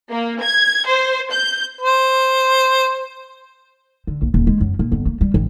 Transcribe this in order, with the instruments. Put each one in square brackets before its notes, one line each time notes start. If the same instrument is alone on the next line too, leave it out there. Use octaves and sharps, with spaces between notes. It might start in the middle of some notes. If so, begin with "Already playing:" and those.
[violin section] A#3
G#6
C5
G6
[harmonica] C5
[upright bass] D3
A#1
D#1
G#3
F#2
A#2
G1
A#3
G3
A1